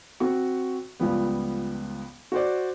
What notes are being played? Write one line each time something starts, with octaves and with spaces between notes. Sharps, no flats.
C4 F#4 C#6
C#2 F3 G3 B3
F#4 C5 D5